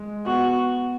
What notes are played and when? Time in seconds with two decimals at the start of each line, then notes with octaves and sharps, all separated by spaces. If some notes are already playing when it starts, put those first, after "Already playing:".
Already playing: G#3
0.26 B3 F#4